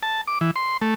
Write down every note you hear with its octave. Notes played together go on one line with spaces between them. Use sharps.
A5
D6
E3
C6
A3